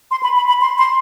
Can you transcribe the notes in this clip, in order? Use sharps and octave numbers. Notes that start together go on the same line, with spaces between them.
C6
B5
B5
B5
C6
C6